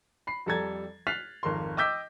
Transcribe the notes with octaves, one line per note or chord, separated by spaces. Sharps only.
B5 C7
F2 G3 A4 A#5 G#6 A6
F6 F#6 A6 B6 C7 F7
G#1 F2 A#4 C6
D#5 G5 D6 E6 G6 B6